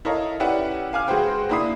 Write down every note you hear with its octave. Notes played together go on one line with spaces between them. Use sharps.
E4 A4 A#4 C#5 D#5 F5
C#4 E4 G4 B4 D5 F#5
F5 G#5 D6 F6
G#3 F#4 G#4 B4 C5 G5
A#3 D4 E4 B5 D#6 C7